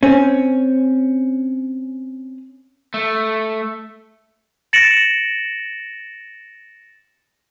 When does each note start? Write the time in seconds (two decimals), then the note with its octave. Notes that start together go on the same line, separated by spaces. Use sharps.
0.03 C4 C#4
2.94 A3
4.73 A6 A#6 C#7 D7 E7 F#7